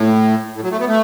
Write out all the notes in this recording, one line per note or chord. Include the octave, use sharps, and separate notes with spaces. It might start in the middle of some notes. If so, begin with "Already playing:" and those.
Already playing: A2
A2
F#3
A3
B3
A3